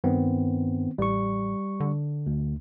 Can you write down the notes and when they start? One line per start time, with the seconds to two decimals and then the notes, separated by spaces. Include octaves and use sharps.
0.04 G2 D#3 B3 C4
0.98 A1 G3 C#6
1.80 D3
2.27 D2